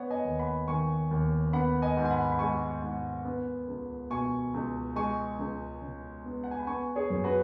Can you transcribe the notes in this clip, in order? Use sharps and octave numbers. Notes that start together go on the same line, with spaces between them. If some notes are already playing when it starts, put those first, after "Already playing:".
Already playing: B3 C#5 F#5
D#5 G#5
D#2
F#5 B5
D#3 G#5 C#6
D#2
B3 F#5 B5
D#5 G#5
G#2
G#5
F#5 B5
B5
G#3 G#5 C#6
G#2
B3
C#2
B2 G#5 C#6
C#2
G#3 G#5 C#6
C#2
C#3
B3
F#5
G#5
B5
B3 G#5 C#6
G#4 C#5
F#2
F#4 B4